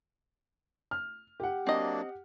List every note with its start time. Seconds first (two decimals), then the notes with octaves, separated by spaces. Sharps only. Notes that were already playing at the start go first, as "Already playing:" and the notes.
0.91 F6
1.40 G4 F#5
1.67 F#3 A#3 C4 D4 D#5